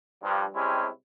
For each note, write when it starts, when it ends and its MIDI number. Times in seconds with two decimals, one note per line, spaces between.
0.24 0.43 43
0.24 0.43 53
0.55 0.87 48
0.55 0.87 55
0.55 0.87 56
0.55 0.87 60
0.55 0.87 61
0.55 0.87 64